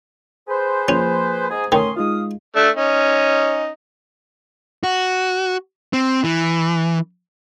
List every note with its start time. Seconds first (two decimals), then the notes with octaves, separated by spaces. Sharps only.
0.48 G#4 B4 C5
0.88 F3 A#3 C#4
1.50 G#2 G#4
1.72 D#3 A3 C#4 A#4 C6 D#6
1.97 G#3 D#4 F4 F5 D#6
2.56 A3 D4 E5
2.76 C#4 D#4
4.83 F#4
5.93 C4
6.24 E3